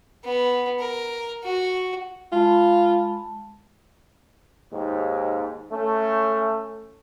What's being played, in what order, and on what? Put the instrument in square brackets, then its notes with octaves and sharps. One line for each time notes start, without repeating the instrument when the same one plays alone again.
[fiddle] B3
A#4
F#4
[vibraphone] G#3 A5 B5 [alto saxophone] F4
[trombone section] D#2 G#2
A3 C#4